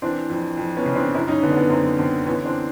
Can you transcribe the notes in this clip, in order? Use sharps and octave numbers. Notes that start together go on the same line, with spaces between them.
E3 C4 D4
F2
F2
B3 C#4
C#3
C4 D4
F#2 D4 E4
C#4 D#4
D3 B3 C#4
D4
B3 C#4
F#2 C4
D3 C4
E3 B3 C#4
C4 D4